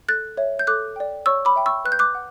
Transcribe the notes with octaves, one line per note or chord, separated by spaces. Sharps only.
A4 F#6 A6
C#5 E5
G6
A4 D6 F#6
D5 G5
C#5 C#6 E6
B5 D6
E5 G5
C#6 E6
B4 F#6
G6
D6 F#6
F#5